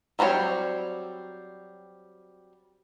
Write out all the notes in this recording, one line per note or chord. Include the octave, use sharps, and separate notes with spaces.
F#3 G3 C4 F#4 C#5